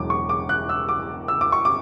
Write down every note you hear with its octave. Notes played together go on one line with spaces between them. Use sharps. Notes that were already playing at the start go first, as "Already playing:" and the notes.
Already playing: E1 E2 F#3 D6
C#6
D6
F#6
E6
D6
E6
D6
C#6
D6